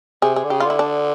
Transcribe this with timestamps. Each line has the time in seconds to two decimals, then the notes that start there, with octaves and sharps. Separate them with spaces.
0.22 C3 G#4
0.36 G#4
0.44 D3
0.50 C#3 G4
0.60 F4
0.65 D3 E4
0.79 D4